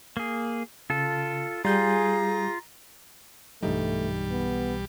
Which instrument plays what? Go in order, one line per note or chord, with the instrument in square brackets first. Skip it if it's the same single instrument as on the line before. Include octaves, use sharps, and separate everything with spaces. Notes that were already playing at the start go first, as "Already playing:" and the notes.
[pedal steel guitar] A#3 G#4
[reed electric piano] C#3 [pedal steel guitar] F4 A4
[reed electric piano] G3 G6 [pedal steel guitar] F4 [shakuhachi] G#4 [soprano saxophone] A#5
[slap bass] B1 E3 F#3 [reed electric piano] G2 D#4 [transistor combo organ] G3 [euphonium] A3
[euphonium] B3